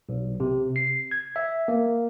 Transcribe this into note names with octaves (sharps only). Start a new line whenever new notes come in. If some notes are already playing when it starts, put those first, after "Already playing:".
B1
C3
C7
G#6
E5
A#3